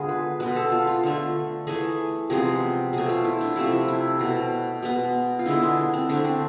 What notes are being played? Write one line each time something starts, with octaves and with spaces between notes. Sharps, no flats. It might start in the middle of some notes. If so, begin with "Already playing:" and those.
Already playing: D3 G#3 B3 F4 G#4
B4
B2 G#3 B3 B4
A4
F4
F4
D3 A3
E3 A3 G#4
C3 F3 G#3 B3 G#4
B2 A3 G#4
F4
E4
D4
C3 F3 A3 E4
E4
B2 A3
B2 G#3 B3
F4
D3 G#3 B3 E4
D4
C4
D3 A3 D4
C4